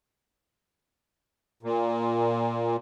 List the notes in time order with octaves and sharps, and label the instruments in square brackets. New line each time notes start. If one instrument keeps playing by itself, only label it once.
[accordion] A#2